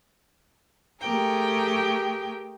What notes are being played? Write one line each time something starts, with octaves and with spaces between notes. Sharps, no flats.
A3 G4 G#4 A#4 G5